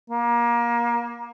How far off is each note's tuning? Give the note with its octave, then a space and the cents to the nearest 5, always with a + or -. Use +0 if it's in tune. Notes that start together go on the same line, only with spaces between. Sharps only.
A#3 +25